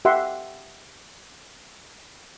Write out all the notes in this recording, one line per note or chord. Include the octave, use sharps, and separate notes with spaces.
G4 E5 F#5 C6